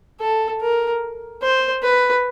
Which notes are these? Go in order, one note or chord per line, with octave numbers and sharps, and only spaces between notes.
A4
A#4
C5
B4